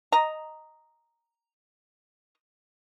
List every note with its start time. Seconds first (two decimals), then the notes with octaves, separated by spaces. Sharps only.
0.12 D#5 A#5